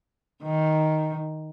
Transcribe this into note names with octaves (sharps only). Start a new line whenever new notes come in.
D#3